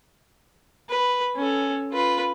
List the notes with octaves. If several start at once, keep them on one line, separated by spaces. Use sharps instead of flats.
B4
C#4 A4
F4 B4